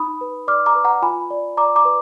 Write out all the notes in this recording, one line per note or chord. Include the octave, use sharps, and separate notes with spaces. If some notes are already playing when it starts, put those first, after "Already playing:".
Already playing: D#4 B5 D#6
B4
D5 D6 F6
A#5 D6
B4
F#5 A#5
F4 G#5 B5
D5
D5 A#5 D6
A#5 D6
B4